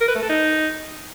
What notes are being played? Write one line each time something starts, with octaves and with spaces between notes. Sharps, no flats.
A#4
B4
A3
A4
D#4